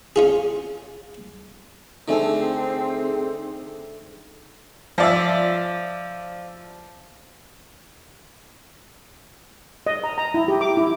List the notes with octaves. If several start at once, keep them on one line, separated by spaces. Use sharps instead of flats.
C#4 F4 G#4
D3 A3 C4 D#4 G#4 A4
F3 D5 E5
D#5
A#5
A#5
E4
G4
D6
E4